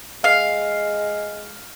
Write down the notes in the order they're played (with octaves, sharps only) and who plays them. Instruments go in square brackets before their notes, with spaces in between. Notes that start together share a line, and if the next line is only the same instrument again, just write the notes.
[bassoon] G#3 [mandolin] F5